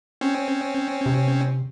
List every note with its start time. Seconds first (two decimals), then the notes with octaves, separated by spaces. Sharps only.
0.21 C4 C#4
1.06 C3